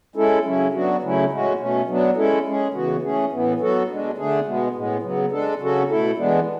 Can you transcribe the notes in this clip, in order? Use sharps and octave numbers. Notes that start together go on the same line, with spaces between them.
G#3 C#4 E4 A4
C#3 F#3 C#4 E4
F#3 B3 D4 F#4
C#3 F#3 A3 C#4 E4
A2 G#3 C#4 F#4
B2 A3 C#4
F#3 B3 D4
G#3 C#4 E4 A4
G#3 C#4 G#4
C#3 E3 B3 F#4
E3 A3 C#4 G#4
A2 E3 B3
F#3 B3 F#4 A4
B2 G#3 D4
D3 A3 D4 G#4
B2 G#3 B3
A2 G#3 B3
C#3 F#3 B3
G#3 D4 A4
C#3 F#3 C#4 F#4 A4
B2 A3 E4 A4
E3 G#3 B3 D4